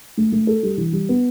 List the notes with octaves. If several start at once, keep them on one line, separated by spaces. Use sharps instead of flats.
A3
A3
A4
G3
E3
G3
B3